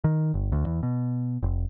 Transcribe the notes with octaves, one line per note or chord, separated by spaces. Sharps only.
D#3
G1
D2
E2
B2
F1